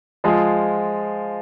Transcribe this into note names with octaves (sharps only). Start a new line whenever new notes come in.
F3 G#3 F4 G#4